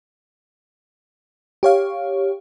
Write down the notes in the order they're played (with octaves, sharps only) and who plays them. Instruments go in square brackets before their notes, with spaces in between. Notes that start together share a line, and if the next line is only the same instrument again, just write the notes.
[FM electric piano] G4 C#5 F5